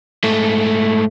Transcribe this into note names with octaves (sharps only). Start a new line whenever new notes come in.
G#2 A3